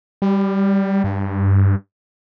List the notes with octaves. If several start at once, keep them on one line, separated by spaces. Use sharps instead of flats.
G3
G2